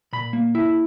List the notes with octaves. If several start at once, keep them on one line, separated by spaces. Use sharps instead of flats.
A#2 B5
A#3
E4